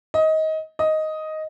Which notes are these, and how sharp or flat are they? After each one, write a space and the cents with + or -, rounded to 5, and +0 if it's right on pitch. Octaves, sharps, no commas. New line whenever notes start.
D#5 +20
D#5 +5